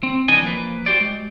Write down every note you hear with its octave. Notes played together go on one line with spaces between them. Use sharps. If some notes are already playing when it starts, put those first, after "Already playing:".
C4
C2 E3 D4 A#4 D#5 G#5
F3 A#3 B4
F#4 G4 C5 D5
G#3